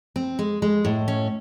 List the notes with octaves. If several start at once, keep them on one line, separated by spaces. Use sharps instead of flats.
C4
G#3
G#3
A2
C#4